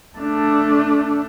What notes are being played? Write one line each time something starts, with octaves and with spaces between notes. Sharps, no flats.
A3 D4